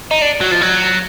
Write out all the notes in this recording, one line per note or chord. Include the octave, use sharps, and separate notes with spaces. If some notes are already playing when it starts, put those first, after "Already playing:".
D#4
D4
F#3
F3
F#3